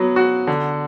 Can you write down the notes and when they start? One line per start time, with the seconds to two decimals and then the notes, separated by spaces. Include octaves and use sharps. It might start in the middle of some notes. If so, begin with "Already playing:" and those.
Already playing: F#3 B3
0.16 F#4
0.47 D3